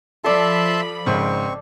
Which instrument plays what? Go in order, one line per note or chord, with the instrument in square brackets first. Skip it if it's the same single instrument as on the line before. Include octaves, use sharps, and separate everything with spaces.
[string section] F3 B5 [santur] A4 D5 [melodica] E5 A5 C6
[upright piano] G#1 G#2 C#3 [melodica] C4 C#6